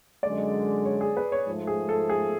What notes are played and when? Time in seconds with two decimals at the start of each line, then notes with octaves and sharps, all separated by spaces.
0.23 F#2 D3 G#3 D5
0.85 C#5
1.01 G#4
1.17 B4
1.32 C#5
1.47 G#2 F3 A3
1.67 G#4
1.89 A4
2.09 G#4